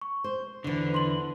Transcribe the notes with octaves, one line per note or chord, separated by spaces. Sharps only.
C#6
C5
E2 D3 E3
E4 C6 F#7